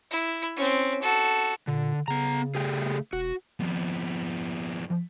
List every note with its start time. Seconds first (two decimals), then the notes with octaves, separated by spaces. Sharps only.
0.11 E4
0.56 C4 C#4
1.02 F#4 A4
1.67 A#2 D3
2.08 C#3 B3 A#5
2.55 A3 G4 G#4
3.13 E1 F#4
3.61 F2 B3